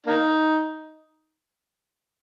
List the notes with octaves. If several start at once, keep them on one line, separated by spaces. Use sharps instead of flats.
A#3 D#4